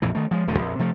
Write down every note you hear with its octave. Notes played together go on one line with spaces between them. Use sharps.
A#1 F2 A#2 E3
D#3 A3
F3 G#3
D#1 E2 D3 A3
A#1 F2
C3 F3 A3